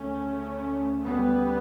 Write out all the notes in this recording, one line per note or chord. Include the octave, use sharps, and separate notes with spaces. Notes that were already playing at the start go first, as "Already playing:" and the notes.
Already playing: D2 C#3 A3 C#4
G3 B3